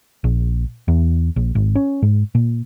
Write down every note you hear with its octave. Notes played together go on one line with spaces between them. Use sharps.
A#1
E2
A#1
G#1
C#4
G#2
A#2